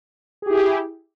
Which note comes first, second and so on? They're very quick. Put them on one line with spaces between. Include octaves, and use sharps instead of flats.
G#4 G4 E4